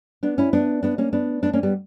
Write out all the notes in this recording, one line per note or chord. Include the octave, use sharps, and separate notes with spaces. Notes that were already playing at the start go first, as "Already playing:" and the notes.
B3 D4
C#4 E4
B3 D4
B3 D4
A#3 C#4
B3 D4
B3 D4
A#3 C#4
G3 B3